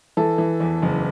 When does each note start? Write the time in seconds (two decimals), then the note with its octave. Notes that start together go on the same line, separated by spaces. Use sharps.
0.17 E3 A4
0.38 E3
0.60 E2
0.82 F#1